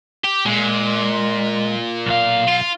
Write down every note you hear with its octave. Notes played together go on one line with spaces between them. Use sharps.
G4
A#2 G#3
B1 F5
F4